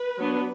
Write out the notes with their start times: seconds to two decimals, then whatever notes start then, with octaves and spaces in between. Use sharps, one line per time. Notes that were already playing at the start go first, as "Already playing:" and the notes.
Already playing: B4
0.19 F#3 B3 D4